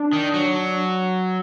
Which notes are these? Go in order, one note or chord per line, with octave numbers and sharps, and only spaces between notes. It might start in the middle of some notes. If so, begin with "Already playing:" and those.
Already playing: D4
D#3
F#3